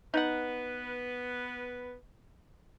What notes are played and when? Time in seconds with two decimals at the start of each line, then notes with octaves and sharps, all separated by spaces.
0.14 B3 D#4 B4 F#5